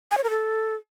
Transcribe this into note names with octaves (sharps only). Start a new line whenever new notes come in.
G#5
C#5
A#4
A4